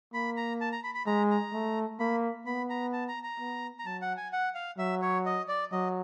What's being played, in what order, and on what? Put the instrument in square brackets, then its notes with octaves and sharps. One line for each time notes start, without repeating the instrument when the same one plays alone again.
[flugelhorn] A#3 [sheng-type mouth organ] B5
[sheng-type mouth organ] A#5
A5
A#5
B5
B5
[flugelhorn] G#3 [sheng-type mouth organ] A#5
[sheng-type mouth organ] A#5
[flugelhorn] A3
[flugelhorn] A#3 [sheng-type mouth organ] B5
[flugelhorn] B3 [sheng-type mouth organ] B5
[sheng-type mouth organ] A#5
A5
A#5
A#5
[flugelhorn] B3
[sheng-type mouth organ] A#5
[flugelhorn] F#3 [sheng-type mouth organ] A5
[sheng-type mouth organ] F#5
G#5
F#5
F5
[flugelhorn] F#3 [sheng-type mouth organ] E5
[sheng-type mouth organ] C#5
D#5
D5
[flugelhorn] F#3 [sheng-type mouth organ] D#5